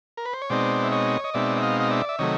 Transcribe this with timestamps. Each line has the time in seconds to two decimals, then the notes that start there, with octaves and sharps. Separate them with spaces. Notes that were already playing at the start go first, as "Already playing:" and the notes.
0.17 A#4
0.25 B4
0.33 C5
0.42 C#5
0.50 B2 G#3 C4 D#4 C5 D5
0.83 E5
0.92 C#5 D#5
1.24 D#5
1.34 B2 G#3 C4 D#4 D5 E5
1.57 E5
1.63 D#5 F5
1.80 D#5
1.91 D5 E5
2.09 E5
2.19 C3 D#3 F#3 A3 C#5 D#5